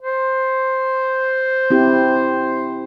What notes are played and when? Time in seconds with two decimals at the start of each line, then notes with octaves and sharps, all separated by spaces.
0.02 C5
1.70 C4 E4 G4